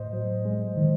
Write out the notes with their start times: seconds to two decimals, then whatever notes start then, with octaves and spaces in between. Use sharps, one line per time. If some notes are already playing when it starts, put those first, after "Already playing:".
Already playing: A2 C5 D#5
0.13 F#3
0.45 G#3
0.76 D#3